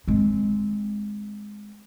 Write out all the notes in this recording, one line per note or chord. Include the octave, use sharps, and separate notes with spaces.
G#3 C4